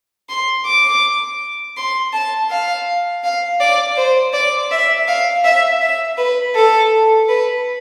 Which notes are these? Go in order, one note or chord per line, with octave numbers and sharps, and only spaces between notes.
C6
D6
C6
A5
F5
F5
D5
C5
D5
E5
F5
E5
E5
B4
A4
B4